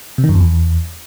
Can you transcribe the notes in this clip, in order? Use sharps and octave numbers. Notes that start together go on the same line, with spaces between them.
C3
D#3
F#2
F2
E2